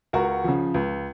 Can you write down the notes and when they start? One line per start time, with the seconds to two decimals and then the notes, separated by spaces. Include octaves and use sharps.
0.13 C#2 F#4 A#4
0.44 C#3 F3
0.74 C#2